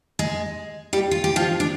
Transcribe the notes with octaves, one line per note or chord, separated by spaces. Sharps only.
G#3 G#4
G3 G4
F4
G4
F3 F4
D4